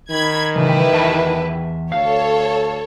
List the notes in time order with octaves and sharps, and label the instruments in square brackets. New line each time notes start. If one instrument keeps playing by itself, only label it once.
[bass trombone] D#3 [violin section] B5 G#6
[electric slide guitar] C#3 E3 [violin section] E4 G4 B4
[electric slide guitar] E2 E5 A5
[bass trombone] D2 [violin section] A4 C#5 [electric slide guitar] F5